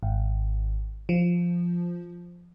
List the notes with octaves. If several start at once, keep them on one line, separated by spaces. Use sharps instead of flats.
G#1
F3